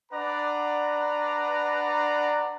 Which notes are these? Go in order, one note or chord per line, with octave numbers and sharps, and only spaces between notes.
D4 B4 D5 F#5 A#5